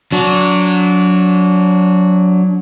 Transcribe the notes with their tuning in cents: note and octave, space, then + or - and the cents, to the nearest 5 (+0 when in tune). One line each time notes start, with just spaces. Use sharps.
F#3 -15 D4 -30